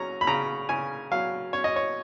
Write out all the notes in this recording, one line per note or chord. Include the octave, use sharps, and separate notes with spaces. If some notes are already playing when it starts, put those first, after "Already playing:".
Already playing: F#3 C#4 A#5
B5
C#3 A#5
C#3 G#5
F#3 F5
C#4 C#5
D#5
C#5